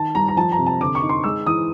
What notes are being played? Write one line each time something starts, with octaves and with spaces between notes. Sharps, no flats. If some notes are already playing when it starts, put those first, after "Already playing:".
Already playing: D#3 A5
G3 A#5
A#5
F3 A5
A#5
C3
A5
D3 D6
C#6
D#4
C6
G#3 E6
E3 D#6